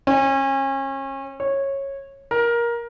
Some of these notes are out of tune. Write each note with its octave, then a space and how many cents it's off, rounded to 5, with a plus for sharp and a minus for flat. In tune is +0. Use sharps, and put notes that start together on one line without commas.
C#4 -35
C#5 -15
A#4 +15